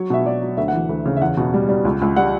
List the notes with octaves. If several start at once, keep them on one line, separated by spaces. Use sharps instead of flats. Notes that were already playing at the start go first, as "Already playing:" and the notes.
Already playing: F#3 C#5
B2 E5
F#3 D5
F#3
D2 E5
F#5
E3
D2
C#3
E5
E2 F#5
B2
G3
G3
C#2
C#2
G3 F#5